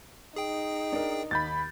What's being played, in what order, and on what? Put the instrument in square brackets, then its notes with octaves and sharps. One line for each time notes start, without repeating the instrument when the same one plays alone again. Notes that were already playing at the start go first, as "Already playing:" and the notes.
[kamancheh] D#4 [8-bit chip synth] G#4 G5
[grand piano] D4 A#4
[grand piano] D#2 [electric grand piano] B5 G6 A6